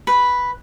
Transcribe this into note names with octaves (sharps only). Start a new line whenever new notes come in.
B4